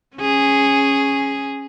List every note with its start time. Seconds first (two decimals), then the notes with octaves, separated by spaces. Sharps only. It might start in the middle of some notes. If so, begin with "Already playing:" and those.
0.17 C#4 G#4